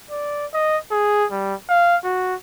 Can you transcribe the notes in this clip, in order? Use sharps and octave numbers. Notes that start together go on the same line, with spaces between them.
D5
D#5
G#4
G3
F5
F#4